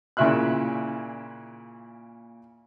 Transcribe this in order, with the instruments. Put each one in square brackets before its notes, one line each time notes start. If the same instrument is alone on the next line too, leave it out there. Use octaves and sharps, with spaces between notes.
[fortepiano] A#2 C#3 E4 E5 C6 F#6